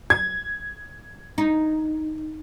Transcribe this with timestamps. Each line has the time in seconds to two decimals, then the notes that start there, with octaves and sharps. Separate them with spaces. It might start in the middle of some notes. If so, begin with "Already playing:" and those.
0.10 G#6
1.38 D#4